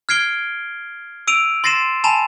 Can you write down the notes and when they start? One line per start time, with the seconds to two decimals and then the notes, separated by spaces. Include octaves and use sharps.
0.09 F6 G#6 C7 D7 G7
1.27 E6 D7 D#7 F7
1.64 C6 A6 A#6 C7 D#7 E7
2.04 G#5 A5 B5 E7